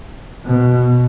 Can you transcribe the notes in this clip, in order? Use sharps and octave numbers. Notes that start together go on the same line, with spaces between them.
B2